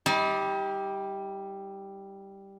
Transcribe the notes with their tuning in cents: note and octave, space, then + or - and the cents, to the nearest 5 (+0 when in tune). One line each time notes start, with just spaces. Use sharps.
G3 +0 D#4 +35